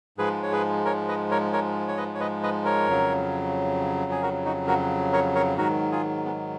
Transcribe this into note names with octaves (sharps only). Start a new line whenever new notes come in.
G#2 F3 G#3 G#4 B4
C#5
G#4 B4
A#4 C#5
B4 D#5
A#4 C#5
A#4 C#5
C#5
B4 D#5
C#5
B4 D#5
B4 D#5
A#4 C#5
F2 C#3 F#3
G#4
F#4 A#4
D#4 F#4
F#4 A#4
A#4 C#5
A#4 C#5
G#2 D#3 F#3 F#4 A#4
F4 G#4
G#3 B3